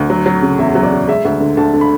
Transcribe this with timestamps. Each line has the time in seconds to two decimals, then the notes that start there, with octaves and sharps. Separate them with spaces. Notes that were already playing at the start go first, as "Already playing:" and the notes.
Already playing: D2
0.10 F#3
0.26 F#3
0.42 C#3
0.59 E2 E5
0.75 F#3
0.83 D5
0.92 C#3
1.08 G#3 E5
1.25 D2
1.40 D3
1.57 D2 A5
1.74 D3
1.81 B5